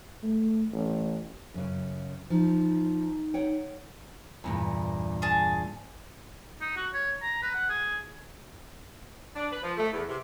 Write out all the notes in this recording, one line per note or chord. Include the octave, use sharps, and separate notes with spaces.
A3
A1
F#2 C#3
F3 D#4
C#5 F#5 G5
E2 G2 A#2
G#4 A5
D#4
F#4
C#5
A#5
B4
F#5
G#4
D4
B4
F3
A3
E2
C3